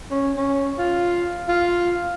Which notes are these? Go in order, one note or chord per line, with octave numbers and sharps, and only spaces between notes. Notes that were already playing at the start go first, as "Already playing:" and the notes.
C#4
C#4
F4
F4